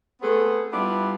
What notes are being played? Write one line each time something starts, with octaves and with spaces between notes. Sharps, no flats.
A3 B3 C4 G#4 A4 B4
G3 B3 D4 E4 F4 G4